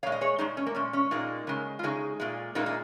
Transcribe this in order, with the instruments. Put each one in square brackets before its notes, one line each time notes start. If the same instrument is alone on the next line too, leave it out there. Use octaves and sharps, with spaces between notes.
[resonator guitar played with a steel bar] A#2 G#3 C#5 F5
D#5
G#4 C#5
A#2 G#3 D#4 G#4
C#4
A#3
A#2 G#3 C#4
C#4
A#2 G#3 A#3 D#4
C#3 G#3
F4
C#3 G#3 D#4 G#4
A#2 G#3
A#2 G#3 A#3 D#4
D#4